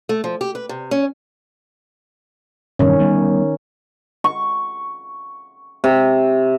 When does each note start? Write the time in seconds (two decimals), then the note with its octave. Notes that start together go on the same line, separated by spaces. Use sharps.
0.09 A3
0.24 F3
0.41 G4
0.55 B4
0.69 C3
0.91 C#4
2.79 E1 G2 D#3 C#4
3.00 G3 B3
4.24 C#6
5.84 C3